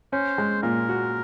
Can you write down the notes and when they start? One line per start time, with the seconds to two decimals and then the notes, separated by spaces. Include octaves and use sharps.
0.13 C#4 C5
0.38 G#3
0.63 A#2 A#4
0.89 F#4